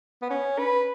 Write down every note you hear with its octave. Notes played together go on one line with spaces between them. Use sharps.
B3
C#4
B4